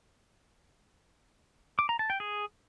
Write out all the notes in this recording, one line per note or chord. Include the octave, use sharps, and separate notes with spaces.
D6
A#5
A5
G5
G#4